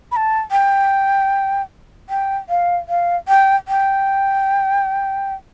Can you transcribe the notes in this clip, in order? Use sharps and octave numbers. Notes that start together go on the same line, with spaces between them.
B5
A5
G5
G5
F5
F5
G5
G5